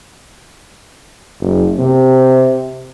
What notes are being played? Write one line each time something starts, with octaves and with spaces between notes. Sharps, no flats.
F#1
C3